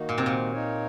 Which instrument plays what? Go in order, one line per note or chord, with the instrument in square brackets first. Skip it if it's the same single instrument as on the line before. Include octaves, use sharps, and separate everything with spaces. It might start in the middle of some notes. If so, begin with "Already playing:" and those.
Already playing: [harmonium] D#3 A#3 D#4 F#4
[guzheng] A#2
C3
A#2
[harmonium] A#3 D#4 A#4 C#5